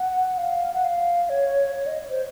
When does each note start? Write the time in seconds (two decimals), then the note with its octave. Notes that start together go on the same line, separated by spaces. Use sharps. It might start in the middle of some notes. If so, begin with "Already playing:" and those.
Already playing: F#5
0.38 F5
0.73 F#5
0.84 F5
1.29 C#5
1.75 C#5
1.87 D#5
2.10 C5